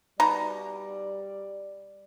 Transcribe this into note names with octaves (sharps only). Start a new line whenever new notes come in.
B2 G3 D#4 D5 A#5